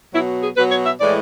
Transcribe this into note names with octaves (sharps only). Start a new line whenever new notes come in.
B2 F#3 E4
G#4
B2 F#3 B4
C#5
E5
A2 E3 G#3 D5